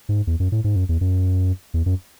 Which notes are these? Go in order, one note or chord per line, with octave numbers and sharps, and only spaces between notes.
G#2
E2
F#2
A2
G#2
F#2
E2
F#2
E2
F#2